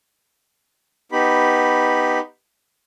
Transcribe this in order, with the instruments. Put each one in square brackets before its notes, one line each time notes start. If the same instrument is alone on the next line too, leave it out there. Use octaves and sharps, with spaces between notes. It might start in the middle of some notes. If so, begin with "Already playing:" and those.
[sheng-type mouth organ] B3 D#4 G4 B5